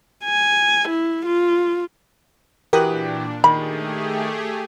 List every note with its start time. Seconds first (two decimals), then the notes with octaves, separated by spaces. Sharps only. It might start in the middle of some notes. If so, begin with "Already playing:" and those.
0.25 G#5
0.89 E4
1.26 F4
2.73 A#2 E3 D4 F#4 G4 A#4 D#6 F#6
3.44 D#3 A3 G4 G#4 B5